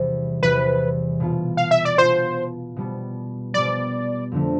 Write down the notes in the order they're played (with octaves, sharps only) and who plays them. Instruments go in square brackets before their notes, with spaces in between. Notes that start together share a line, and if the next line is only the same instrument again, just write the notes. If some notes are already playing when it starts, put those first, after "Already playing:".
Already playing: [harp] E2 C3 E3 G3
[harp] E2 C3 E3 G3 [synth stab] B4
[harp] B2 B3 F4
[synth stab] F5
E5
D5
[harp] B2 B3 F4 [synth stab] C5
[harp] B2 G3 B3
[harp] B2 G3 B3 [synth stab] D5
[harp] F2 D3 A3